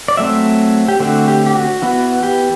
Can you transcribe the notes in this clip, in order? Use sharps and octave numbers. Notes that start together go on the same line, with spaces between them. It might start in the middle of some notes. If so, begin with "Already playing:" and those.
D5
F#3 A3 C4 E5
G4
D3 A3 C4 F#4
G4
G4
F#4
E3 B3 F#4
G4